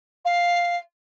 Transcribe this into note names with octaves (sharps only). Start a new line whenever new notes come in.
F5